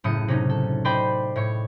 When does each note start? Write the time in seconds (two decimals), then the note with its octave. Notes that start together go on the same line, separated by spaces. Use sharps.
0.04 F#1 A2 C#3 D#6 C#7
0.28 C3 C#4 D#4
0.50 A4
0.85 C5 D5 D#5 G5 B5
1.36 A2 C#5 C#6